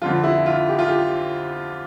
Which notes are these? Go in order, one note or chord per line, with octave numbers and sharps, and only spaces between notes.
F2 D3 F3 F4
E4
F4
G4
F4
G4